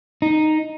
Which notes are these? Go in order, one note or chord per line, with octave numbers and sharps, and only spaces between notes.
D#4